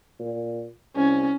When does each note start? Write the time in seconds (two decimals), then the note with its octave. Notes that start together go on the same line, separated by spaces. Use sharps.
0.19 A#2
0.96 C2 C#4